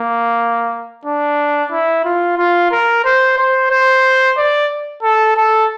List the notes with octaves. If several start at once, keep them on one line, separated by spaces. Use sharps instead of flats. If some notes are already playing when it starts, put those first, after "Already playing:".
Already playing: A#3
D4
E4
F4
F4
A#4
C5
C5
C5
D5
A4
A4